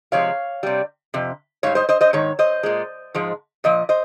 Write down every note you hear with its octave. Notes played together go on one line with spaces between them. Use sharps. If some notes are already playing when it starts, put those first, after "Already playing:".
C3 F3 G#3 C#5 F5
C3 G3
F2 C3
G#2 G3 C#5 F5
C5 D#5
C5 D#5
C5 D#5
G#2 D#3 C#5
C5 D#5
A#2 G#3
G#2 F3 G#3
A#2 F3 D#5
C5 D#5